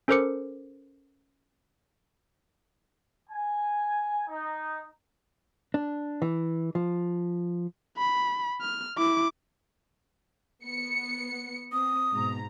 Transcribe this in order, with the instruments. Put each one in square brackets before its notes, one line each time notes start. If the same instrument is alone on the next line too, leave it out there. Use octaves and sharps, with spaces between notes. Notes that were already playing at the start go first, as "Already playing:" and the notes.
[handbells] C#4 A4 A#4 C5 D6 C#7
[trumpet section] G#5
D#4
[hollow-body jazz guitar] D4
E3
F3
[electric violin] B5
F6
E4 D6
[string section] B3 C#7
[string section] C4 [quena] D#6
[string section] G#2 B2 A#5